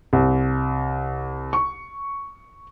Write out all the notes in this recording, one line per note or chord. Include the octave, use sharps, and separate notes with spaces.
C2
C#6